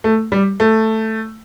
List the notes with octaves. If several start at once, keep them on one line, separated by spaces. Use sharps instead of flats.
A3
G3
A3